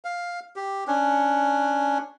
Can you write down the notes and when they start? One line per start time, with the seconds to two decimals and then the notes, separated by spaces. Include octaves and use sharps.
0.05 F5
0.56 G4
0.87 C#4 D4